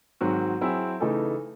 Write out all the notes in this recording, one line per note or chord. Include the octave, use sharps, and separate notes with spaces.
G#2 D#3 F#3 C4 F#4
F#3 C4 E4 G#4
C#3 E3 A3 D#4 A4